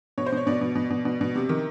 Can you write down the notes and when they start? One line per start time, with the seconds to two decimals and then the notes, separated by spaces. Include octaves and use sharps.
0.18 B2 C#5
0.26 C5
0.32 B2 C#5
0.47 B2 D5
0.61 B2
0.75 B2
0.90 B2
1.05 B2
1.21 B2
1.35 C3
1.49 D#3